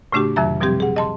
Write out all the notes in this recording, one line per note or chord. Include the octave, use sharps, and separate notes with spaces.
A2 C#3 A3 D4 F#4 G4
F2 C3 D#3 F#3 E5 A#5
B2 F3 G3 C4 G4 G#6
G#4 F#5
D#5 A5 C6